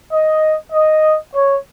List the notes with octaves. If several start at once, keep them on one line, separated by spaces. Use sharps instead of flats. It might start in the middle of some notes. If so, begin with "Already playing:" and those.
D#5
D#5
C#5